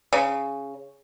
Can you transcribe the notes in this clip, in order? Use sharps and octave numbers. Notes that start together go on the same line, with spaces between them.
C#3